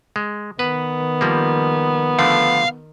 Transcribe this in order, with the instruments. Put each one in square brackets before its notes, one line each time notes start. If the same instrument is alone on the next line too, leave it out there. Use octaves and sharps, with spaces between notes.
[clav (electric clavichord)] G#3
[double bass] D#3 [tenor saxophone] B3 [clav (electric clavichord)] B4
[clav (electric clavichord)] F3 G3 A#3
[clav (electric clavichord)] D3 F3 A3 [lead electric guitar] F5